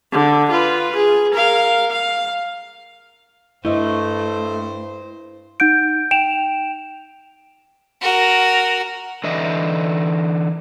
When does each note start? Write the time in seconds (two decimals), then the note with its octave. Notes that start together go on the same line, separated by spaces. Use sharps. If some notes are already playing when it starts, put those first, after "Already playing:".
0.13 D3
0.51 F4 B4
0.96 G#4
1.35 A#4 F5
1.91 F5
3.65 G2 A3 E4 C5 D#5
5.60 D#4 F#5 G6 D7
6.11 G5 D7 E7 F7
8.01 F#4 A#4
9.24 D3 E3 D#5 E5